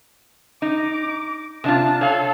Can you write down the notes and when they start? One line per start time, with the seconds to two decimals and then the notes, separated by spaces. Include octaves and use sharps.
0.62 D#4 D6
1.64 C3 D4 F4 A5
2.01 A4 C#5 F5